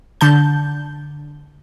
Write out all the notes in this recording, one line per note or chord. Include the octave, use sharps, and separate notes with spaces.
D3 A5 G6